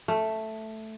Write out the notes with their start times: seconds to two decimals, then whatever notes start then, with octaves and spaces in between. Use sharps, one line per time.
0.08 A3